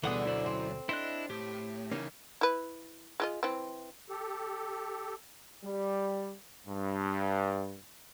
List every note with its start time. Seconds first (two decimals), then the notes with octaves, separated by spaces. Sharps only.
0.04 D2 B2 D3 E3 G3 G#4 F#5 D#6
0.26 F#2 E4 C5 D5
0.46 C4
0.89 D4 E4 C5 D#5 F#6
1.30 A2 G4
1.91 C#3 E3 A#3 C#4 D#4
2.41 E4 B4
3.20 G#3 F4 D#5
3.43 E3 C4
4.09 G4 A4
5.64 G3
6.67 G2